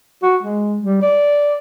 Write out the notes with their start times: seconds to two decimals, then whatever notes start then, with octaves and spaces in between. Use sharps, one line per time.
0.22 F#4
0.43 G#3
0.82 G3
1.02 D5